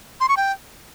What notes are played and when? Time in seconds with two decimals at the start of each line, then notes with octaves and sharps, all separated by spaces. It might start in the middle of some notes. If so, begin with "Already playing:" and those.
0.20 C6
0.29 C#6
0.37 G5